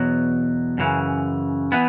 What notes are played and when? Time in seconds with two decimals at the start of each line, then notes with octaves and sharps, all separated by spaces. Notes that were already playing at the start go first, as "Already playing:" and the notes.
Already playing: E2 B2 F#3
0.78 F#2 C#3 E3
1.72 E3 B3